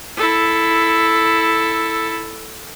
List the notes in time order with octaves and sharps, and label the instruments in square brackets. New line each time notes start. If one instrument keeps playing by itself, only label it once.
[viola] E4 A4